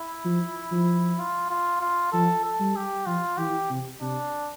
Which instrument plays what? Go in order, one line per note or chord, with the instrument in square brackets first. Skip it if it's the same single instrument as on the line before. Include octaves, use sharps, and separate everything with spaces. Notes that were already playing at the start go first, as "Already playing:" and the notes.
Already playing: [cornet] E4
[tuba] F3
F3
[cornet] F4
F4
F4
[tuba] F3 [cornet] A4
[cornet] A4
[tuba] G3
[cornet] G4
[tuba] F3 [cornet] F4
[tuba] E3 [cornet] G4
[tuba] C3
[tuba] C3 [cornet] D4